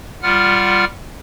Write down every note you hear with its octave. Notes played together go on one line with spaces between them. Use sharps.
G3 F4 F#5 F6